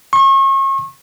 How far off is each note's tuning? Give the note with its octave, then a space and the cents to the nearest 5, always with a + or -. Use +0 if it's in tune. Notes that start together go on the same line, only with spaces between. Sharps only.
C#6 -35